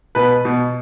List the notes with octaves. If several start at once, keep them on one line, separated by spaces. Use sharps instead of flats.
B2 B4
B2